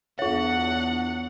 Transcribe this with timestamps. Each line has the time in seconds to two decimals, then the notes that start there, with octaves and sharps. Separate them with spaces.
0.19 E2 D4 F4 C#5 F#5